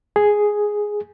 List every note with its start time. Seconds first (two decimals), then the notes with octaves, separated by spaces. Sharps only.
0.16 G#4